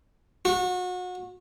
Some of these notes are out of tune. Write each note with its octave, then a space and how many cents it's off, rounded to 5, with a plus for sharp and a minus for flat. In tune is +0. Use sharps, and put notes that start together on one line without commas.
F#4 -30